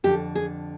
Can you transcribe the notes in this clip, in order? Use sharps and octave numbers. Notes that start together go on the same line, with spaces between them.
F2 D3 G4
G#4